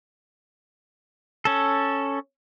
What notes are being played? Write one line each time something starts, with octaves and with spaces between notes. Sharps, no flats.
C#4 A4